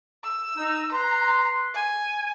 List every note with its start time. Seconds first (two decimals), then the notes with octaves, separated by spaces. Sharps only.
0.24 E6
0.57 D#4
0.92 B4 A#5 C6
1.74 G#5